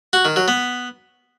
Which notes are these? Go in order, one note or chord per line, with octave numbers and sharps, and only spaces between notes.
F#4
D#3
F#3
B3